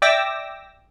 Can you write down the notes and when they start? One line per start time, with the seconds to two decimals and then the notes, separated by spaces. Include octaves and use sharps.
0.02 D5 E5 G5 D6 E6 A#6